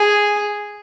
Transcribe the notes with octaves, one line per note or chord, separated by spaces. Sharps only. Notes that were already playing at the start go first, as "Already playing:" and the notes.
Already playing: G#4